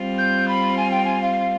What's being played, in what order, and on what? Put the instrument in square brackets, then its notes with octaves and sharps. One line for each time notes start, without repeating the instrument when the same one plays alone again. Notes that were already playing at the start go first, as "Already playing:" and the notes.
Already playing: [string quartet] G3 C4 F4
[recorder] G6
B5
G#5
G5
G#5
F5